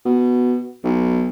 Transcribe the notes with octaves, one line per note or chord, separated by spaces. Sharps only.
B2
B1